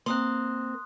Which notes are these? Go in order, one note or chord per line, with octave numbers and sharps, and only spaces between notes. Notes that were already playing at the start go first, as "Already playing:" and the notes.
A#3 C4 C6 D#6 F#6